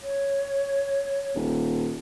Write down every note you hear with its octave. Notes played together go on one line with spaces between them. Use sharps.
C#5
D#1